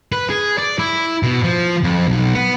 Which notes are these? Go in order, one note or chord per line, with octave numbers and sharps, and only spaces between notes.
B4
G#4
D5
E4
B2
F3
F2
B1
B3